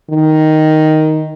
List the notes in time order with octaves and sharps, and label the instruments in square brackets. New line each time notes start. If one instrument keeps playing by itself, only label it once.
[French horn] D#3